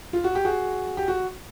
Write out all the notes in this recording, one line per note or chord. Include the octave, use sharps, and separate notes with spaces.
F4
F#4
G4
F#4 G#4
G4
F#4